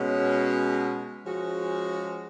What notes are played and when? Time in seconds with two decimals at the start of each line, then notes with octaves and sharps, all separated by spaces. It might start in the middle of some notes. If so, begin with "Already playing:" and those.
Already playing: B2 G#3 C#4
1.26 F3 G#3 C#4 F#4